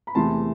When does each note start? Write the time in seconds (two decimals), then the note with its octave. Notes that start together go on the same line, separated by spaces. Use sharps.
0.07 B5
0.15 E2 C3 E3 A3 A5 C6